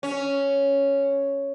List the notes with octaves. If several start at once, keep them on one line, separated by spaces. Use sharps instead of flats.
C#4